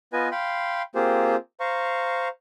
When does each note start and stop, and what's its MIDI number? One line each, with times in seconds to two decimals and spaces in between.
0.13 0.28 59
0.13 0.28 65
0.13 0.28 71
0.13 0.28 75
0.13 0.28 80
0.32 0.82 77
0.32 0.82 79
0.32 0.82 83
0.32 0.82 84
0.95 1.36 58
0.95 1.36 60
0.95 1.36 65
0.95 1.36 67
0.95 1.36 68
0.95 1.36 72
1.60 2.28 72
1.60 2.28 77
1.60 2.28 82
1.60 2.28 85